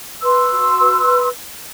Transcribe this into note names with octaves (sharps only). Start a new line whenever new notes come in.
B4 C6 E6
F#4
B4